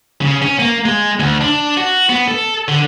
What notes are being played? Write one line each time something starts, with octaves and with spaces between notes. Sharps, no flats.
C#3
C#4
A#3
G#3
D2
D4
F#4
B3
A4
D3